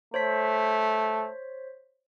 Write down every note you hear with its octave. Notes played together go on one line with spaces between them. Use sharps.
A3 C5 C#5 B6